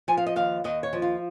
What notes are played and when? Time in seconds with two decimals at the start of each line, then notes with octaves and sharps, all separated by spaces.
0.08 F3 G#5
0.17 F5
0.26 D#5
0.36 D#2 F5
0.64 D#2 D#5
0.83 C#5
0.93 F3
1.02 F4